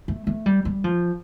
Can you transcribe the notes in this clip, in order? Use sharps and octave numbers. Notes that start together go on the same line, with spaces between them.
A3
A3
G3
G3
F3